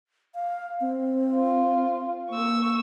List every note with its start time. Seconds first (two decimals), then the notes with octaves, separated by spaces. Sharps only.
0.35 F5
0.81 C4
1.34 F4
2.30 A#3 C#6 E6